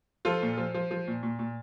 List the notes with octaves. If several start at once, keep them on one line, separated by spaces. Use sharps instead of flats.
F3 F4 A4
A#2
F3
F3
F3
A#2
A#2
A#2